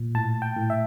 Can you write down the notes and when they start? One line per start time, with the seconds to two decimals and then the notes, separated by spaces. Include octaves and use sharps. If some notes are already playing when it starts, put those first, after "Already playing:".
Already playing: A#2
0.15 A2 A5
0.42 G5
0.56 A2
0.70 E5